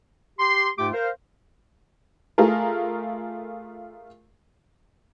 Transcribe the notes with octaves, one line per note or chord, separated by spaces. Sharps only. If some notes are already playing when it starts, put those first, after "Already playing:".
G4 C6
G#2 A3 F4 G4 G5 D6
A#4 C5 F5
A3 F4 G#4 A#4